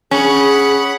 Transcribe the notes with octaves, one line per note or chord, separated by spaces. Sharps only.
C#4 G#4 F#5 B5